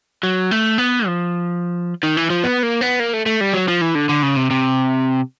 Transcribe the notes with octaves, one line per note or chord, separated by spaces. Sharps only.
F#3
A3
B3
F3
D#3
E3
F3
B3
A#3
B3
A#3
A3
A3
G3
F#3
F3
E3
D3
D3
C#3
C3
C3